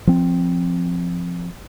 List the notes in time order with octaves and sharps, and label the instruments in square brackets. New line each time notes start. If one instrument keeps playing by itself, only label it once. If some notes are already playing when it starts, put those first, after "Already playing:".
[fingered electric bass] F3 C4